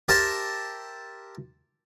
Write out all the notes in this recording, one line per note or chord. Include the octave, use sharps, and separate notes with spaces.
G4 A#4 C5 E5 A5